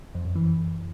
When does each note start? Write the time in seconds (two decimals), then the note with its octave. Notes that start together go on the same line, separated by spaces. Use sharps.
0.15 F2
0.25 F#2
0.35 E3